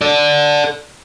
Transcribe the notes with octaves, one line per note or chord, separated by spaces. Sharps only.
A4 D5